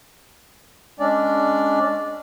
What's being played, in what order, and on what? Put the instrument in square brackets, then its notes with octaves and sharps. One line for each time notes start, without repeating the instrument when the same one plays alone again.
[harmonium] G#3 C#4 D4 D5